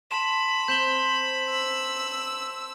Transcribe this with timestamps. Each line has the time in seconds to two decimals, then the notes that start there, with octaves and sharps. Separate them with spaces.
0.11 A5 B5 C6 E7
0.68 C4 G6 E7 G7
1.50 E6